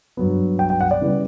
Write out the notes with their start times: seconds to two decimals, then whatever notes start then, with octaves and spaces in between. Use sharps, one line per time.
0.17 G2 F#3 B3
0.59 G5
0.70 G5
0.81 F#5
0.91 D5
1.01 C#3 E3 G3 B3